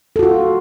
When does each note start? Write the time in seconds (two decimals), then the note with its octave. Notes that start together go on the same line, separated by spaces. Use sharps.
0.16 A4
0.19 F#4
0.23 F4